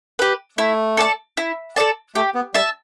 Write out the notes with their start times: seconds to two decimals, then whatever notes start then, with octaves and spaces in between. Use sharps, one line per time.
0.19 G4 B4
0.58 A3 E4
0.97 A4 D5 A5
1.37 E4
1.76 A4 D5 A5
2.15 A3 G4
2.35 B3
2.54 G3 E5 A5